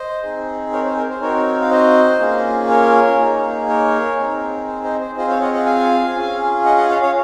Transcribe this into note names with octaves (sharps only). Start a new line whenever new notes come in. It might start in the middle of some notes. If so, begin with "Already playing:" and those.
Already playing: C5 D#5
C4 D#4 G#4
A#4 C#5
C5
A#4
C5
C4 D#4 F#4 A#4 C#5
F5
C5 D#5
A#3 C#4 F4 G#4
A#4 C#5
A#3 D#4 G#4
A#4 C#5
C4 D#4 G#4
C5
C5 D#5
C5
C4 F4 G#4 C5 D#5
C#5 F5
D#5 F#5
D#5 F#5
F5 G#5
C#4 F4 G#4
D#5 F#5
D#5 F#5
C#5 F5
C#5 F5